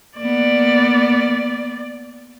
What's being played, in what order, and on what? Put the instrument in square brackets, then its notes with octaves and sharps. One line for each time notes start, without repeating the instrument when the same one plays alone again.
[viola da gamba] A#3 B3 [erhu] D5